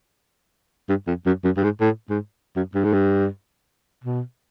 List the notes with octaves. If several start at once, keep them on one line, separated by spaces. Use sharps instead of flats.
G2
F2
F#2
F#2
G2
G#2
A2
G#2
F#2
G2
G#2
G2
B2